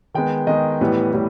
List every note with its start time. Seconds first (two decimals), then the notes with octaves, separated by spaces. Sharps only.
0.15 D#3 G#3 B3 G5
0.47 D#3 G#3 B3 D#5
0.81 A2 E3 G3 B3
1.13 A2 E3 G3 B3